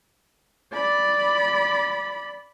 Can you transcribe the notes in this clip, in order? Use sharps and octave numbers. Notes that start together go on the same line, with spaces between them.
D5 B5